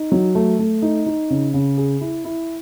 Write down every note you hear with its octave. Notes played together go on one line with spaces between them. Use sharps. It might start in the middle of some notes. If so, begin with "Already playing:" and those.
Already playing: D#4
F#3
A3
A3
D#4
D#4
C#3
C#3
G#4
E4
E4